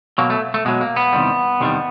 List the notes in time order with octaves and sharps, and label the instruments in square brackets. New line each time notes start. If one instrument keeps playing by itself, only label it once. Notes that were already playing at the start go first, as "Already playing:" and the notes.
[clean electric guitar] B2 F#3 A#3
A3
A3
B2 F#3 G#3
A#3
B3
E2 C3 D#3 G3
E2 C3 D#3 G3